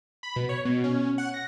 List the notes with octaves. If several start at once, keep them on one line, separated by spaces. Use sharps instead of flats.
B5
B2
C#5
B2
C#4
F#5
A#6